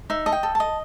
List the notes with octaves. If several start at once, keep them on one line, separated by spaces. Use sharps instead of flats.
D#4 E5
D#5 A5
G5
A4
A5
D#5